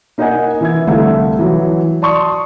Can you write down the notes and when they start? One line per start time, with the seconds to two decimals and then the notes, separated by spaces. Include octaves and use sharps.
0.18 A#3 D#4 A#4 D#5 F#5 G#5
0.61 E3 E5 G#6
0.87 C2 D3 A3 E5 F5
1.39 E3 F#3
2.02 D5 A5 C6 C#6 D#6